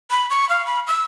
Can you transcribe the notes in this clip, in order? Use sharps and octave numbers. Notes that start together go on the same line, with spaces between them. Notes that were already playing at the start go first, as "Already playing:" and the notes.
B5
C#6
F5
B5
E6